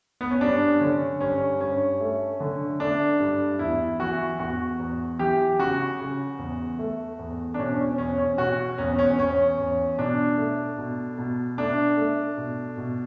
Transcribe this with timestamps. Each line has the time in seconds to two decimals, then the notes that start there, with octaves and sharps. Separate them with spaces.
0.21 B3
0.30 C#4
0.41 G2 D4
0.80 D3 C#4
1.20 G2 C#4
1.60 G2 C#4
2.01 A3
2.40 D3
2.80 A3 D4
3.20 G2
3.59 E2 E4
4.00 E3 F#4
4.39 E2 F#4
4.80 E2
5.19 E3 G4
5.59 C#3 F#4
6.00 C#3
6.39 E2
6.79 A3
7.19 E2
7.54 D4
7.59 B2 C#4
7.79 C#4
7.98 E2 C#4
8.19 C#4
8.38 B2 F#4
8.78 E2 C#4
8.99 C#4
9.19 E2 C#4
9.58 E2
9.98 B2 D4
10.37 A3
10.78 B2
11.18 B2
11.58 A3 D4
11.97 A3
12.37 B2
12.77 B2